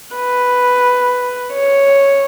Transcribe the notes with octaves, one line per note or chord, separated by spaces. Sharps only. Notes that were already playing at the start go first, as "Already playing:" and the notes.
B4
C#5